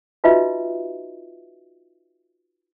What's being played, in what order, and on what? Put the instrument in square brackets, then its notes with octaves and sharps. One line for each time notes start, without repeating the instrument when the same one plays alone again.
[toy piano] D#4 F4 F#4 B4 D#5 E5